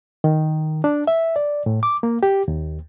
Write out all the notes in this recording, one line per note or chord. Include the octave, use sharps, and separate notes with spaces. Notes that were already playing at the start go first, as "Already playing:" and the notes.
D#3
D4
E5
D5
A2
D6
A#3
G4
D#2